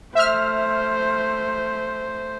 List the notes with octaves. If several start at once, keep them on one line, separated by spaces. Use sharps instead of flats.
A3 C5 E5 F6